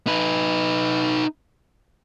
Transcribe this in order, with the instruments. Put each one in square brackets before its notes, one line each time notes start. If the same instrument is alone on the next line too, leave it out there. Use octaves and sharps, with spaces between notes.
[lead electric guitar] D#4 B4